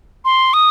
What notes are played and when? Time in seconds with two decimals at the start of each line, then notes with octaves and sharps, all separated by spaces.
0.25 C6
0.54 D#6